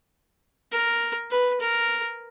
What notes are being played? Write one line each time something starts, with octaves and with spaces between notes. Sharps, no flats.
A#4
B4
A#4